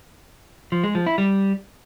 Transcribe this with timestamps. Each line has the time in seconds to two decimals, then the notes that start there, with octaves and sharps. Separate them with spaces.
0.72 F3
0.84 G#3
0.95 F3
1.06 E4
1.18 G3